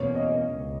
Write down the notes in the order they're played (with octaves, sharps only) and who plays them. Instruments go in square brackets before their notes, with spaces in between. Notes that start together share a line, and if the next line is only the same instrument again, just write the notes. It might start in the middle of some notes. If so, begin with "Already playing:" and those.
Already playing: [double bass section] E2 B2 A#3 C#4 [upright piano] C#5
[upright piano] D#5
[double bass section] C#2